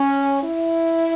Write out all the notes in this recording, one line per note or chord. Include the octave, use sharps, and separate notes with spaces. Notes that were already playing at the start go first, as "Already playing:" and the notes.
Already playing: C#4
E4